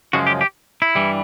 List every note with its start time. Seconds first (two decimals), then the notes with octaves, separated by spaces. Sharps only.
0.13 F#2 C#3 F3 G#3 F#4
0.27 G4
0.41 G4
0.82 E4
0.95 G2 E3 G3